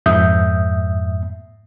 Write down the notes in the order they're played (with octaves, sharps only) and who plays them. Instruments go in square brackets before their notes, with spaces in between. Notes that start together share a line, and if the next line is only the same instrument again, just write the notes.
[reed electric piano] F2 G#2 E5 D#6 G6